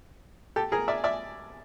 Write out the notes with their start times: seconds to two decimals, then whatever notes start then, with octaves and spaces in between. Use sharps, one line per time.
0.56 G4 A4
0.72 G#4 A#4
0.88 D5 E5
1.04 D5 E5